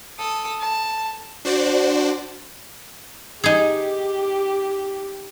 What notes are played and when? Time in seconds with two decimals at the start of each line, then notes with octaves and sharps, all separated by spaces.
0.19 A4 D#6
0.60 A5
1.45 D4 F#4 C5 D5
3.44 D#4 G4 G#4